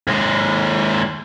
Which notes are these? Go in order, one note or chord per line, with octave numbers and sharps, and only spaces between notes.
D#2 G#3